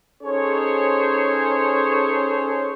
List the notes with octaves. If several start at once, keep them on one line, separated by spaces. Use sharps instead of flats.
C#4 D#4 G#4 A4 C5 C#5